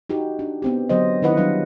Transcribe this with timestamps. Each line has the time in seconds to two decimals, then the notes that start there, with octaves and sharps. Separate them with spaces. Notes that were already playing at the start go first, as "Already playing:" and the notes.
0.09 D#4 F#4 G4
0.39 D4
0.62 B3 C4 G4
0.89 D3 F#3 B3 C5 D#5
1.22 D#3 D#4 E4 B4 D#5 F#5
1.37 F#3 G3 D4 B4 F5